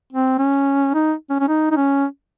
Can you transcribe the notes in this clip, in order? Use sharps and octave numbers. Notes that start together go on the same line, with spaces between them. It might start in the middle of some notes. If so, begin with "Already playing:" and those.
C4
C#4
D#4
C#4
C#4
D#4
D#4
C#4